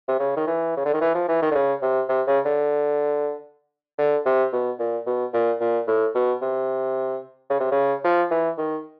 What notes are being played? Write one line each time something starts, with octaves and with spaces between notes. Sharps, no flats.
C3
C#3
D#3
E3
C#3
D3
D#3
E3
F3
E3
D#3
D3
C#3
C3
C3
C#3
D3
D3
C3
B2
A#2
B2
A#2
A#2
A2
B2
C3
C#3
C3
C#3
F3
E3
D#3